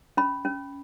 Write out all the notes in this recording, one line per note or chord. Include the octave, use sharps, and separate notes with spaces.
C#4 B5
C#4